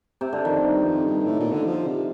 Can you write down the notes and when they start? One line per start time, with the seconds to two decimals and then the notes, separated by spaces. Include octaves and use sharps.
0.21 C3
0.33 D3
0.45 F2 D#3
0.65 G2
0.85 F2
1.05 G2
1.25 A2
1.40 A#2
1.52 D3
1.66 F3
1.87 C3